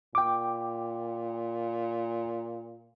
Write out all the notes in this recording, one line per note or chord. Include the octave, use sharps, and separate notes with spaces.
A#2 G5 D6